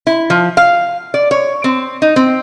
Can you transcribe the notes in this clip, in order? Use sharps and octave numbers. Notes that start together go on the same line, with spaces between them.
E4
F3
F5
D5
C#5
C4
D#4
C4